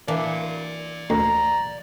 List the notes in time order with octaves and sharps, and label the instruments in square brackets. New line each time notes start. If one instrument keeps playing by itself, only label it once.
[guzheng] E3 A#3 D4 [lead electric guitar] D5 F5
[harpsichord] D2 [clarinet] A#5